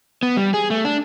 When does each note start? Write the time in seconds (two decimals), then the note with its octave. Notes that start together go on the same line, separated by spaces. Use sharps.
0.23 B3
0.37 G3
0.54 G#4
0.70 A3
0.85 D4